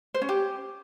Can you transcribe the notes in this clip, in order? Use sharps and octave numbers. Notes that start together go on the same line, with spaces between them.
C5
C#4
G4